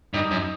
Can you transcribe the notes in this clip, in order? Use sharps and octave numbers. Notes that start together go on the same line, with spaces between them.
G2 D#4
F#2